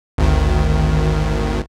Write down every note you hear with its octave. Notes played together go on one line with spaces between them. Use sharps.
G#1 D2 D#3